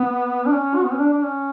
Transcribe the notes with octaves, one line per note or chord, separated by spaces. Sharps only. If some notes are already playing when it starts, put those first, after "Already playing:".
Already playing: B3
D4
C#4
F#4
B3
C#4
D4
D4
C#4